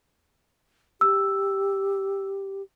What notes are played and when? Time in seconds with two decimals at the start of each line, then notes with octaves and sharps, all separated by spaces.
1.01 G4 E6